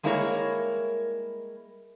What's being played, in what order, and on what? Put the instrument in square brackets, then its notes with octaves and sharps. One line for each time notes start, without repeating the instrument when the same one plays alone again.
[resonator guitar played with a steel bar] G3 G#3 A#3 E4 A#4 C#5